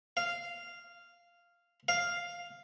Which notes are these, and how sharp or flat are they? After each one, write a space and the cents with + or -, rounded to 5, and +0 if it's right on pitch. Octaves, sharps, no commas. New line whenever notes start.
F5 -10
F5 +0